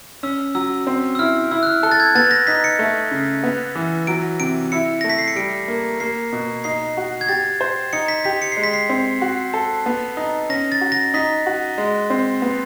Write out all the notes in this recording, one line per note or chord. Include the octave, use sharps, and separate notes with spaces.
C#4 E6
F#3 E6
C4
E6
E4 F6
E4 E6
F#6
F6
A4 F#6
A6
G#6
B3 A6
A#6
D#4 B6
C#7
A3
C#3
B3
E3
F#3 D7
C3 D7
E4 C#7
A3 A#6
B6
C7
C#7
G3 D7
A#3
A#3 C7
B2
D#4 C7
F#4
G#6
G4 A6
C5
D#4 C#7
B6
G4 B6
C#7
G#3 C7
B6
C7
C4
F#4
A4
B3
D#4
C#4 A#6
A6
F#4
A#6
D#4 B6
F#4
G#3
C4
B3